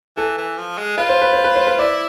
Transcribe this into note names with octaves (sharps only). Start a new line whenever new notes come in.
E3 A4
E3
F3
G#3
F4 B4
C5
B4
C5
B4
C5
B4
E4 D5